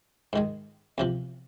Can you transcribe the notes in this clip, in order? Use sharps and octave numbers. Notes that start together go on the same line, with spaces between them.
G#2 D#3 G#3
E2 C3 F3